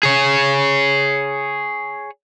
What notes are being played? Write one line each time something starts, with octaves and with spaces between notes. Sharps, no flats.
G#4 C#5